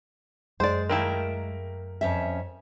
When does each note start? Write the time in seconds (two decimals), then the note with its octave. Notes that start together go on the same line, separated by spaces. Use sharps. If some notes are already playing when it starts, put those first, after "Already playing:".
0.60 F#2 G#3 C5 D5
0.90 A3 A#3 E4 A#4 G5
2.01 F2 C#4 E5